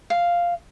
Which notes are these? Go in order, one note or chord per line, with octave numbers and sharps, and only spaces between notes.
F5